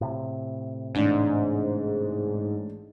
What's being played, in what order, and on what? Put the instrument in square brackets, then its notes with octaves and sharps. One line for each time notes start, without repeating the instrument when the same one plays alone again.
[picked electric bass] A2 C3
[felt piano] A1 D4 [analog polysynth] G#2